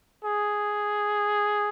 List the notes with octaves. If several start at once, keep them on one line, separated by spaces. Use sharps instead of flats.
G#4